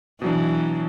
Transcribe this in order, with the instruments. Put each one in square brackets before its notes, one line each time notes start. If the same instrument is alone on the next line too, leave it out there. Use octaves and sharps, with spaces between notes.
[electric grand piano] B2 F#3 D4 [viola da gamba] E3